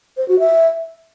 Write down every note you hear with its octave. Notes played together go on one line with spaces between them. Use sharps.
C5
F#4
E5